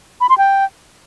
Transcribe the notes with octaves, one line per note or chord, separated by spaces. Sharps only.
B5
C6
G5